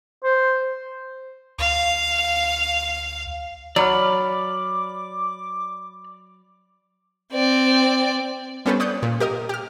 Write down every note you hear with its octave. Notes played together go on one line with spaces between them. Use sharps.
C5
D2 F5
F#3 D5 B5 D6 F6
C4 D5
G3 B3 C#4 A4 B4 C5
C#5 D5 D#6 F#6 G6
A#2
G4 A#4 D#5 D#6
G4 F6